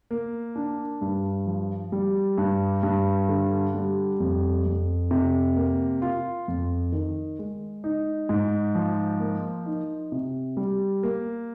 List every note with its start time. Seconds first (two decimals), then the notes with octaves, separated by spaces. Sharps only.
0.11 A#3
0.56 D4
1.01 G2
1.46 F3
1.92 G3
2.38 G2
2.83 G2
3.29 D3
3.75 G3
4.20 F2
4.66 F2
5.11 C3
5.56 A#3
6.02 F4
6.48 F2
6.92 D#3
7.39 G#3
7.84 D#4
8.29 G#2
8.75 F3
9.20 A#3
9.66 D#4
10.12 C3
10.57 G3
11.03 A#3